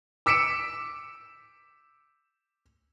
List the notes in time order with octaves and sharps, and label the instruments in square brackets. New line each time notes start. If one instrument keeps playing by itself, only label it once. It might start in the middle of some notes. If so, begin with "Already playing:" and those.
[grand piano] D6 E6 B6 C#7 D7 E7